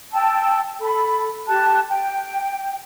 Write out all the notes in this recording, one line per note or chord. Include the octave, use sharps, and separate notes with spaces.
G5 A5 E6
A4 B5
G4 A5 F#6
G5